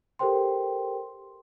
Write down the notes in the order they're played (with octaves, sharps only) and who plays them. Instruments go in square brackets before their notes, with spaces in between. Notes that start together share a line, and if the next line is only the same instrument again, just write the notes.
[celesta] G4 A4 A#4 C5 G5 C6